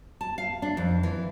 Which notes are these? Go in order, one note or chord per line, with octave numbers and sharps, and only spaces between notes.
A5
F5
D4
F2
E3